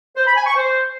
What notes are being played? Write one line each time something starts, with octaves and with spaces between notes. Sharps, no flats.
C5
B5
G#5
C#6
C5